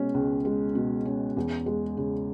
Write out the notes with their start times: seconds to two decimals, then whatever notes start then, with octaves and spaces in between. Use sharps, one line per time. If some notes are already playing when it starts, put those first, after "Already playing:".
Already playing: B2 G#3 C#4
0.14 C#2
0.45 G#3
0.75 B2
1.06 C#4
1.36 E2
1.66 G#3
1.97 C#3